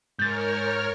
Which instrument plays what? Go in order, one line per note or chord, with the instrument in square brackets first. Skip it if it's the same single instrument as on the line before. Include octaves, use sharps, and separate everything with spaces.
[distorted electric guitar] G#2 [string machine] A#4 C#5 F6 [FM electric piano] G6 A6